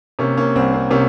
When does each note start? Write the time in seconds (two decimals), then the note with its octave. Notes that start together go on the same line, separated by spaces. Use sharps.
0.19 C3 A#3 C#4
0.37 A#3 C#4
0.55 C2 C4
0.74 C4
0.91 C3 A#3 C#4